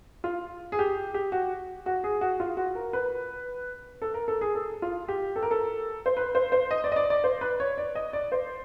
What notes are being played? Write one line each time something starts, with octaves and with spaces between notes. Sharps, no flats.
F4
G#4
G4
G4
F#4
F#4
G#4
F#4
F4
F#4
A#4
B4
A4
A#4
A4
G#4
A4
F4
G4
A4
A#4
A4
C5
B4
C5
C5
D#5
D5
D#5
D5
D5
C5
B4
C#5
D5
D#5
D5
C5